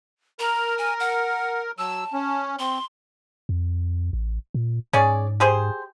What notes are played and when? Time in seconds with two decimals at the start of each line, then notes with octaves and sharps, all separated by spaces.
0.40 A#4 A#5
0.78 G#5
1.00 F#5
1.79 F#3 A5 E6
2.13 C#4
2.59 C4 C6
3.49 F2
4.13 A1
4.54 A#2
4.93 G#2 C#4 G#4 D5
5.40 G4 G#4 C5